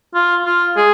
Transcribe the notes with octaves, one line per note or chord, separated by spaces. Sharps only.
F4
F4
G#4